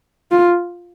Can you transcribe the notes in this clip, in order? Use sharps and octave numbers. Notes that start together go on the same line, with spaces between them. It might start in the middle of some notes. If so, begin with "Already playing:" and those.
F4